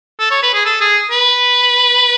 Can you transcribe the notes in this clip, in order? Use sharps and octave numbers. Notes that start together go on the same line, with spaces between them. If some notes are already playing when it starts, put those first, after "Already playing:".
A4
C#5
B4
G#4
A4
G#4
B4